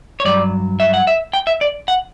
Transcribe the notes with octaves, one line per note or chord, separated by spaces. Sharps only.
C#5
G2 F#3 D5
E5
F#5
E5
G5
E5
D5
F#5